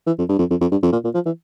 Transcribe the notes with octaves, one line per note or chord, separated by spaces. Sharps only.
E3
F2
G2
F2
F2
F2
G2
F2
A#2
A#2
F3
E3